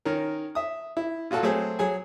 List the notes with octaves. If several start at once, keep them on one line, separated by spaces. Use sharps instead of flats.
D#3 C#4 A#4
E5 D#6
E4
A#2 F4 F#4 A4
F#3 A3 C4 G#4
F#3 G#4 G#5